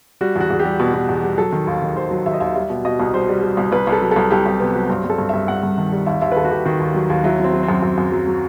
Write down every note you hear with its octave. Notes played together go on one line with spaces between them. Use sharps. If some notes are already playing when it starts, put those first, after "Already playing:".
G3 F#4
E2 F#4
E2
G4
G3
B2
B2
E2
G3
F#3 A4
D#3
D#2
D#3
D#2 C5
F#3
D#2 E5
D#5
D#2 E5
G3 E5
B2
B2 D#5
C2
G3 C5
G3
G3
C2
C2 B4
C2
A4
F#3
A4
C2
C2 G4
C2
C3 B3
F#3
G2 C4
G2
A4
G2
G2 E5
G2 F#5
G2
D#3
G3
D#2 E5
D#2 E5
B4
D#2 A4
F#4
D#2 G4
D#3 F#4
D#2
F#3
D#2
F#3 E4
F#3 C4
F#3
C4
F#2
F#2
F#2
F#3
F#3